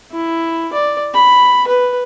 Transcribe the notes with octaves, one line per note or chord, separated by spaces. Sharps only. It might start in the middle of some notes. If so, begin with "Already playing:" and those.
E4
D5
B5
B4